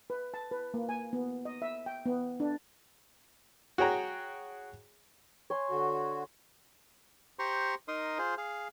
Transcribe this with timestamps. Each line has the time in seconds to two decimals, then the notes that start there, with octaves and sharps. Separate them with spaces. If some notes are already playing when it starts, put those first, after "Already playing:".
0.10 B4
0.34 A5
0.51 B4
0.74 A#3
0.89 G#5
1.13 B3
1.45 D#5
1.62 E5
1.86 G5
2.06 B3
2.40 D4
3.78 F#4 G#4 C#5 G5 A#5
5.50 C#5 G#5 C6
5.70 D3 F#4
7.39 G4 C5 A#5 C6 C#6
7.88 D#4 A#4 C6 D#6
8.18 F4 G#4 C5
8.38 G#4 F5